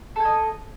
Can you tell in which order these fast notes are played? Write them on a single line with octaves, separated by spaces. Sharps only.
A4 G#5 D#5